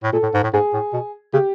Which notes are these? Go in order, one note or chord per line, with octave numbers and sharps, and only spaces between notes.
A2
A#2 A4
A2
G#2
A2
G#2 G#4
A2
B2
C#3 G4